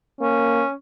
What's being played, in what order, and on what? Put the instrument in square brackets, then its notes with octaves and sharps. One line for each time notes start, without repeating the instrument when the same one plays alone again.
[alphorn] A#3 [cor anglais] C#4